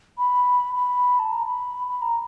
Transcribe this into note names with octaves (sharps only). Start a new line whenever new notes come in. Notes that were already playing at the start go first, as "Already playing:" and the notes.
B5
B5
A5
A#5
B5
B5
A#5